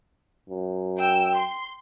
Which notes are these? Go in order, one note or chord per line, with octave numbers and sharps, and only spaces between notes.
F#2
G5 E6
C6